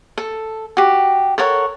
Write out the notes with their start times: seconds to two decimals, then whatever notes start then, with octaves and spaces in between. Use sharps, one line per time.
0.18 A4
0.77 F#4 G4
1.38 A4 A#4 C#5 F#5